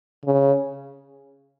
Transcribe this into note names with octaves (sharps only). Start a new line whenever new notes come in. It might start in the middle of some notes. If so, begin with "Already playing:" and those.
C#3